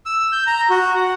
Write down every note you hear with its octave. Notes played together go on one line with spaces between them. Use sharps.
E6
G6
A#5
F#4
F#5